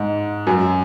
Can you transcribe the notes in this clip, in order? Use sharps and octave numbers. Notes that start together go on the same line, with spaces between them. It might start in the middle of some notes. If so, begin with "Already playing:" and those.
Already playing: G#2
F#2